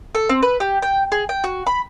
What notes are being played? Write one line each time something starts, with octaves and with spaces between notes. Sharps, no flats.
A4
C4
B4
G4
G5
G#4
G5
F#4
B5